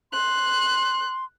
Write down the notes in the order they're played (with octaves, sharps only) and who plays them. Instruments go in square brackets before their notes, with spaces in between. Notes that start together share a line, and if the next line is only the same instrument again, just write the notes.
[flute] C6 [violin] F#6